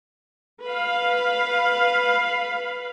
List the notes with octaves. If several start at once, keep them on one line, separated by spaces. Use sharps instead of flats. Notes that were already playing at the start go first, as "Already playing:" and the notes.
B4 F5